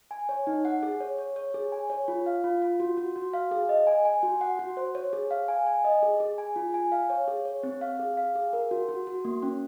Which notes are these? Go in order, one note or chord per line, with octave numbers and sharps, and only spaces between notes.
G#5
C#5
D#4
F#5
G#4
C#5
C#5
C#5
G#4
G#5
C#5
F4
F5
F4
F4
F#4
F#4
F#4
F5
G#4
D#5
G#5
G#5
F#4
F#5
F#4
C5
C#5
G#4
F5
G#5
G#5
D#5
G#4
G#4
G#5
F4
G#5
F5
C#5
G#4
C#5
C4
F5
G#4
F5
G#4
A#4
F#4
F#4
F#4
A#3
C#4